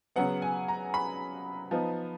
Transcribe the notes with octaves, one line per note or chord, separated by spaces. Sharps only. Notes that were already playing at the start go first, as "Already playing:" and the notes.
C#3 F#3 B3 F#5
G#5
A#5
B5
F3 B3 D#4